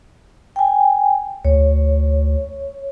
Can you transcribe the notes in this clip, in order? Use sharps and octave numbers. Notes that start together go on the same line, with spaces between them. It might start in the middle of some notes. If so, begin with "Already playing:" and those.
G5 G#5
D2 C#5